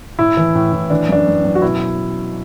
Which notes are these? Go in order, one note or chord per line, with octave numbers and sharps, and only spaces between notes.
A2 E4
E3
A2
A2
E3 D4
F#2 D4
F#2
F#2
F#4
B2 E4